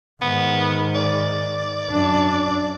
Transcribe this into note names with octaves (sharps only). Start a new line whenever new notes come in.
G#2 D#3 B3
D5
F#2 D4